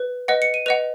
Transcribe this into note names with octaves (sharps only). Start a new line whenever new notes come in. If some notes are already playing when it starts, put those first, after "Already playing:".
Already playing: B4
B4 D#5 F#5
C#7
D#7
B4 D#5 F#5 F7